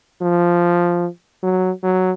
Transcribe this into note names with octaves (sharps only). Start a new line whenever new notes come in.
F3
F#3
F#3